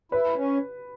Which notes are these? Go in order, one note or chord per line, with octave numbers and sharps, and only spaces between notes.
E4 B4
C#4